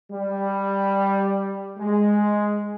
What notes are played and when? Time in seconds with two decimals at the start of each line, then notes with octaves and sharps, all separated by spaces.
0.10 G3
1.78 G#3